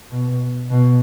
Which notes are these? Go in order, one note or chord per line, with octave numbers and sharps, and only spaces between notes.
B2
B2